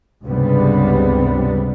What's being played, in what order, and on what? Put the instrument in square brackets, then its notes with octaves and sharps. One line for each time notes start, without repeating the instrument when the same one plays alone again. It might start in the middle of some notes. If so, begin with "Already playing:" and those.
[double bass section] C#2 G2 C3 G3 B3